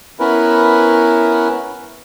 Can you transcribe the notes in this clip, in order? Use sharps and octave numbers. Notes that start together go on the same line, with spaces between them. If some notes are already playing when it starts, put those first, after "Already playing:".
B3 C#4 E4 A#4 B4